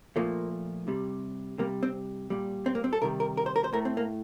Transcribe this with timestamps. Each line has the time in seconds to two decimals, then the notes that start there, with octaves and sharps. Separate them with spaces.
0.16 A#2 F3 A3 A#3
0.88 C3 G3
1.58 C3 G3 A#3
1.83 C4
2.30 A#2 G3
2.66 C4
2.75 A#3
2.84 C4
2.93 A4
3.01 C3 D#3 G3 A#4
3.20 A#4
3.37 A#4
3.46 C5
3.56 A#4
3.64 C5
3.73 A2 A3 A#4
3.85 C4
3.97 A#3